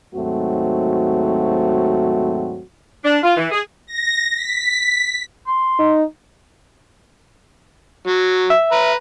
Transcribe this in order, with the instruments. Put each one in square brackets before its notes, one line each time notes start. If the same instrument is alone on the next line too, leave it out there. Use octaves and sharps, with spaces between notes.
[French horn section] D#2 G#2 F#3 A3 C4 F#4
[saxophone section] D4
F4
E3
G#4
[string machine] A#6
B6
[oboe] C6
[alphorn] D#4
[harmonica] F#3
[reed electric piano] E5
[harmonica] B4 A#5